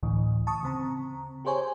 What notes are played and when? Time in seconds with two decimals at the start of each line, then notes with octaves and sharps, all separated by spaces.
0.03 D2 A2 D3 E3
0.47 A5 C#6 D#6
0.63 C#3 C4 A#5
1.45 G4 G#4 C5 C#5 G#5